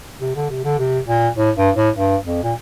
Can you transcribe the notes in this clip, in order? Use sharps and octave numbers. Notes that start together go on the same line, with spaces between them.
C3
D3
C3
D3
C3
A#2
A2
G2
A2
G2
F2
A#2